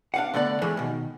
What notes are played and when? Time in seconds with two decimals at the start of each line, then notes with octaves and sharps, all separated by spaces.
0.14 D4 F5 F#5
0.34 D3 A3 B3 D5 F#5
0.62 E3 G#3 A3
0.77 B2 D#3